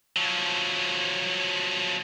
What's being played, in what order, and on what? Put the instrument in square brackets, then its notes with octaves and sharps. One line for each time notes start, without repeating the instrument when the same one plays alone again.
[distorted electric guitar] F3 F#3